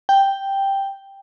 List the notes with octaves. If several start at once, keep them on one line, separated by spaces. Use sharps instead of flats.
G5